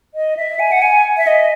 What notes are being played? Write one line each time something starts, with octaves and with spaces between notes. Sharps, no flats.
D#5
E5
G#5
F#5
G#5
E5
D#5